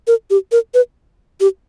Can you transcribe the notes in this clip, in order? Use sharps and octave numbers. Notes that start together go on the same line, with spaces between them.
A#4
G4
A#4
B4
G4